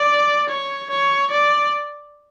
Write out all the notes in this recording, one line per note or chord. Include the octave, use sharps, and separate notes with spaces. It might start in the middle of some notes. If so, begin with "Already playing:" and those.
Already playing: D5
C#5
C#5
D5